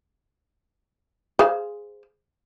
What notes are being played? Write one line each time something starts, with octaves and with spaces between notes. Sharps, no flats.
G#4 C5 F5